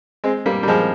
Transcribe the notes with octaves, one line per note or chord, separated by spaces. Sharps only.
G#3 C4
G3 A#3
G3
F3 G#3